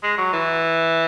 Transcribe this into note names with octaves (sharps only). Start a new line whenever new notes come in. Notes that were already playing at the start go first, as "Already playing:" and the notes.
G#3
F#3
E3